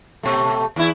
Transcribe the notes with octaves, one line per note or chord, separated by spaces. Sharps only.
B2 A3
E2 E4